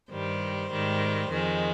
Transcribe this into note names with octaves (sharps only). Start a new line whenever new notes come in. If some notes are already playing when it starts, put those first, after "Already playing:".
G2 D#3 G3 C5
G#2 D#3 G3
F2 D#3 G#3